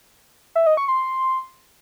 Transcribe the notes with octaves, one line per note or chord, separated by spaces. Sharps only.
E5
D#5
C#6
C6